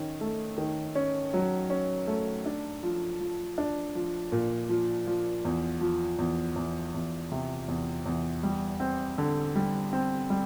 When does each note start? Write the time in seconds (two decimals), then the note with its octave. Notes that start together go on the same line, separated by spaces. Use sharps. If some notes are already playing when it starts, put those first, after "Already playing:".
Already playing: D#3 C#4
0.21 A3
0.58 D#3
0.95 C#4
1.34 F#3
1.70 C#4
2.07 A3
2.46 D4
2.83 F3
3.21 F3
3.58 D4
3.95 F3
4.32 A#2
4.69 F3
5.07 F3
5.45 E2
5.81 F3
6.19 E2
6.56 E2
6.94 E2
7.32 C3
7.68 E2
8.06 E2
8.43 G3
8.80 C4
9.18 D3
9.55 G3
9.93 C4
10.30 G3